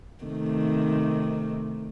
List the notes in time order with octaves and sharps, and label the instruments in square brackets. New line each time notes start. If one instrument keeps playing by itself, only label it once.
[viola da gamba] C3 D#3 A3